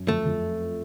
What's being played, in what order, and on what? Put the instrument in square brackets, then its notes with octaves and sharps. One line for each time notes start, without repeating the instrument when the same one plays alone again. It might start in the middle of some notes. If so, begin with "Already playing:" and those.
Already playing: [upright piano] F#2
[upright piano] F2 [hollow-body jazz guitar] A3
[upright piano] F2